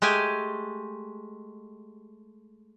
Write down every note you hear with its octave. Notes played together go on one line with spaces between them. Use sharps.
G#3 A3 G4 G#5